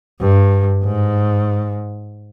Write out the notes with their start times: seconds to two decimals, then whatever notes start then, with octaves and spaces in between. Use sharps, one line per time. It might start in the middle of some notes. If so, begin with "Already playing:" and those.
0.21 G2
0.84 G#2